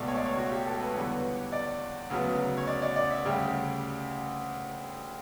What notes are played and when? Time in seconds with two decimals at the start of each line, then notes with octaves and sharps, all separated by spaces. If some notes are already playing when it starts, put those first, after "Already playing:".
Already playing: C#2 B2 A3 D5
0.08 C#5
0.17 D5
0.26 C#5
0.37 F#4
0.52 G4
0.66 A4
0.80 B4
0.94 E2 D3 G3 B3 C#5
1.52 D5
2.10 D2 C#3 F#3 B3
2.57 C#5
2.67 D5
2.82 D5
2.96 D5
3.11 E5
3.25 D2 C#3 G3 G4